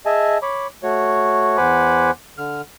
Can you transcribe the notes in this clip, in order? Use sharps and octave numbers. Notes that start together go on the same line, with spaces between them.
G#4 D#5 E5 G#5 A5
C#5 B5 D6
A3 F#4 C#5
E2 C5 F#5 G#5 B5 D6
D3 F6